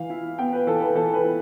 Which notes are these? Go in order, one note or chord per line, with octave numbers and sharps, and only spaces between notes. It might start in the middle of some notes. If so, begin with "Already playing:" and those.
Already playing: E3 F5
E4
B3 G5
B4
E3 A4
B4
E3 A4
B4
E4